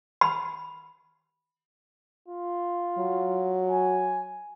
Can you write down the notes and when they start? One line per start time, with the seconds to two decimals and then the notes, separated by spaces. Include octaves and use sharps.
0.21 B5
2.28 F4
2.98 F#3
3.70 G#5